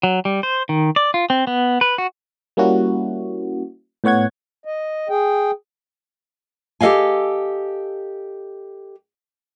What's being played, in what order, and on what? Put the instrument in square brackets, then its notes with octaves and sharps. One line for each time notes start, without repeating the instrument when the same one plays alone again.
[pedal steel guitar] F#3
G3
C5
D#3
D5
F4
C4
B3
B4
F#4
[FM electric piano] G3 A#3 C#4 E4 F#4
A2 B3 C#5 F#5 G#6
[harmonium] D#5
G#4 G5
[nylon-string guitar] G4 A4 A#4 D#5 F5 G#5